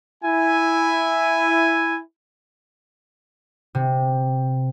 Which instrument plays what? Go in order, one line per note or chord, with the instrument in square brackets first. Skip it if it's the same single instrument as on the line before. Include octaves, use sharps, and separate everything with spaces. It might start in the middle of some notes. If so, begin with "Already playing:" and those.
[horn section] E4 G#5
[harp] C3